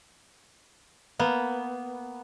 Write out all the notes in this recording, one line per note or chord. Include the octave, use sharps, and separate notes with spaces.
A#3 B3